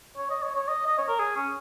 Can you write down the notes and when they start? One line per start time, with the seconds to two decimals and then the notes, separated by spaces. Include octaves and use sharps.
0.17 C#5
0.30 D#5
0.43 C#5
0.55 C#5
0.68 D#5
0.87 D#5
0.98 C#5
1.08 A#4
1.19 G#4
1.36 C#4